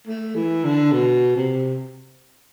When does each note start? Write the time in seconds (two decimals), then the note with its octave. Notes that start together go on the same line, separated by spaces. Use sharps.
0.07 A3
0.35 E3
0.64 D3
0.93 B2
1.36 C3